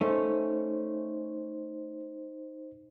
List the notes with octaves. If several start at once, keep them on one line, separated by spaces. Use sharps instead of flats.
A3 C#4 D#4 C5